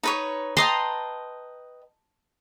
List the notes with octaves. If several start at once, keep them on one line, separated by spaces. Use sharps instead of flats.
D#4 B4 C#5
B4 D#5 G5 A5 A#5 C6